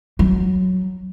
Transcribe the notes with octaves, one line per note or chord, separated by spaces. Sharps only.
F#3